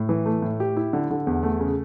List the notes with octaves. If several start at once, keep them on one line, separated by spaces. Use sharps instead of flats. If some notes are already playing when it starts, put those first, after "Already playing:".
Already playing: A2
E3
A3
A2
G4
E4
D3
D3
E2
A3
C#3